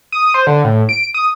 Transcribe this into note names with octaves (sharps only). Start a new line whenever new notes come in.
D#6
C5
D3
A2
D7
D#6